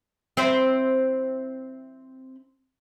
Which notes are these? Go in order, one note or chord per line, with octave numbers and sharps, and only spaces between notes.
C4 E4 C5